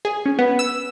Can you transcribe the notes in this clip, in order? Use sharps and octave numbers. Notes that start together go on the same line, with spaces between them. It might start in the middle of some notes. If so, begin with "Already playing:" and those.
G#4
C#4
B3
E6